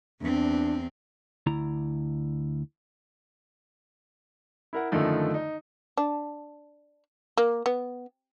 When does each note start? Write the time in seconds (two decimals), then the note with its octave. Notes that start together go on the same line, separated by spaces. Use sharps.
0.21 E2 C4 D4
1.47 D2 E4 A#5
4.73 E4 A#4 F#5
4.92 F#2 D3 D#3 F3 A3 D#4
5.34 D#4
5.97 D4
7.37 A#3
7.66 B3